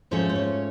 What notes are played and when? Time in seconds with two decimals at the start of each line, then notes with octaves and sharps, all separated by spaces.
0.11 G#2 F3 A3 C#4 C5
0.29 C5
0.36 C#5